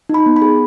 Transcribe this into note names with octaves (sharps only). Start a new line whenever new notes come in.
D#4 B5
B3
B5
G#4